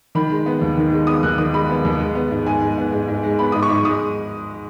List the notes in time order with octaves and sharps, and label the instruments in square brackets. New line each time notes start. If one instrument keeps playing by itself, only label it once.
[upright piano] D#3 B5
G#3
B3
D#2
D#3
G#3
B3 D#6
D#2 F#6
D#3 D#6
G#3 B5
B3
D#2
G#3
B3
G#2
G#2 G#5
G#3
B3
G#2
G#2
G#3
B3 B5
G#2 D#6
C#6
G#2
G#3 D#6